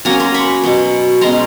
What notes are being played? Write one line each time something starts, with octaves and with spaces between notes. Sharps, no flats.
F#3 A#3 C#4 G#5 A#5
A#5 C6
B5 C#6
B2 F#3 B3
B2 G#3 C#4 A#5 C6